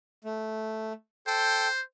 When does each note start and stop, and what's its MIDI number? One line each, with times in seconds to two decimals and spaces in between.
0.24 0.93 57
1.27 1.68 69
1.27 1.81 72
1.27 1.68 79